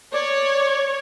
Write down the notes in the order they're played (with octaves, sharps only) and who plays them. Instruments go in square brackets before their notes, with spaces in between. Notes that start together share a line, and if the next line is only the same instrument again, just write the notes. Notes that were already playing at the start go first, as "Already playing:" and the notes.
[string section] C#5 [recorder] D5